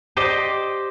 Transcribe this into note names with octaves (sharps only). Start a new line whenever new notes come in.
G4 C5 D5 D#5